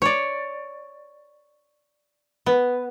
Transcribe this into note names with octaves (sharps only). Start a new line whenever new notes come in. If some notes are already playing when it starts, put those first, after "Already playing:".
C#5 D5
B3